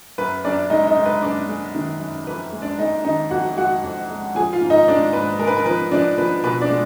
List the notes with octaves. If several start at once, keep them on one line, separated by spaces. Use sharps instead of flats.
F#2 B4
F#2 D4 D5
G#3 D#4 D#5
D#4 D#5
G#3
B4
F#2 D4 D5
G#3
D#3
F#2
F2 B4
G#3
D4 D5
G#3 D#4 D#5
D#3 D#4 D#5
F2 F#4 F#5
G#3 F#4 F#5
F2
G#3
F3 G#4 G#5
F4 F5
G#2
D#4 D#5
G#3 D4 D5
G#2 B4
G#3 A#4
B4
A#4
F3 B4
F3 D4 D5
F3 B4
B2 B4
D4 D5
G#3